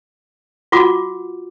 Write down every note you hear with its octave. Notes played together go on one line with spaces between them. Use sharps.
F4 F#4 F#5 D6